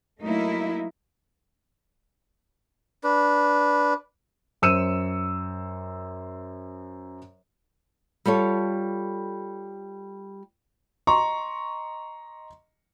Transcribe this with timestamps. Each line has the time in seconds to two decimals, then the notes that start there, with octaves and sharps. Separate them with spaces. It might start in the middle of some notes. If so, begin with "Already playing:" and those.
0.21 F#3 A3 A#3 D#4 E4
3.04 D4 B4
4.62 F#2 C5 E6 C#7 D#7 E7
8.26 G3 F4 A4 C#5
11.07 D#5 A#5 C6 C#6